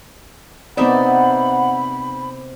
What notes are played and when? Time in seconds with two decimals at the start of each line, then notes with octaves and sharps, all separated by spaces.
0.77 C3 B3 D#4 D5 E5 F#5 B5